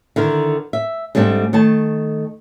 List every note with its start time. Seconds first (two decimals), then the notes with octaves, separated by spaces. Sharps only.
0.16 D3 D#3 E4 A#4
0.73 E5
1.15 G#2 G3 A3 C4 D4
1.53 D#3 A3 A5